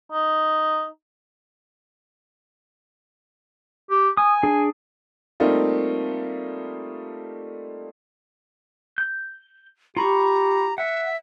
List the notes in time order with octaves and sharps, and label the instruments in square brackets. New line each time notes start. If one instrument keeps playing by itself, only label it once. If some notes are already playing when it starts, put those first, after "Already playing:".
[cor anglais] D#4
[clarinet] G4
[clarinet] G#5 [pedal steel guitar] D#6
[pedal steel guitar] D4 G#4
[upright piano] G3 A3 A#3 C4 D#4 F4
[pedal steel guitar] G6
[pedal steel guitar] F4 B5 C#6 [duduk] G4 [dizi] A#5
[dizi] E5 [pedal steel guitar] F#5